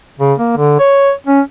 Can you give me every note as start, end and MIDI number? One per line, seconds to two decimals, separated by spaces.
0.20 0.34 49
0.39 0.53 58
0.57 0.78 50
0.80 1.12 73
1.27 1.41 61